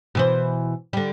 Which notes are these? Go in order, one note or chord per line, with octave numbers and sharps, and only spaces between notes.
B2 E3 C5
D3 G3